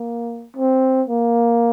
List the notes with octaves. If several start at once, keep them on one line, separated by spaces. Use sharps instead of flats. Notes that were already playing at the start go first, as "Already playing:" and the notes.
Already playing: A#3
C4
A#3